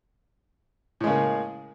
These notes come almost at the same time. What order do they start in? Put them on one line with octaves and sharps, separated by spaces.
A2 G#3 C#3 A#3